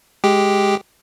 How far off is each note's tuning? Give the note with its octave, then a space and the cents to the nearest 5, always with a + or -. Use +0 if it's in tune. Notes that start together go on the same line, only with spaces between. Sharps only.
G#3 +0 G4 +0